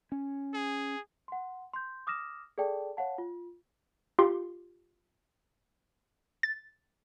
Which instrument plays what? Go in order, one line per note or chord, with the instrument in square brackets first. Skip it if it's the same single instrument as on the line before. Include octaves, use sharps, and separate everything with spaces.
[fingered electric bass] C#4
[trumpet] G#4
[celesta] F#5 C6
C6 G6
D6 D#6 F6 A#6 E7
G#4 A4 D5 G5 A5
C#5 F5 F#5 A5
F4
[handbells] F4 G4 C6
[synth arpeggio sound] A6